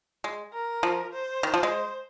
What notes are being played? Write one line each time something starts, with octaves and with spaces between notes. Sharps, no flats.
G#3
A#4
F3
C5
D#3
F3
G#3